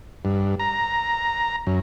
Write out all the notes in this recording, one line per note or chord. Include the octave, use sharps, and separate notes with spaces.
G2
A#5
F#2